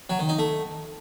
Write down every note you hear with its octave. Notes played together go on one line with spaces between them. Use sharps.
F#3
D#3
D#4
A3